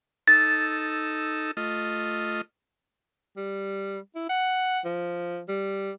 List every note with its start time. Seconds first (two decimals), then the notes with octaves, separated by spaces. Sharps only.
0.28 D#4 A4 E6 A6
1.57 A3 F4 D#5
3.37 G3
4.15 E4
4.29 F#5
4.85 F3
5.49 G3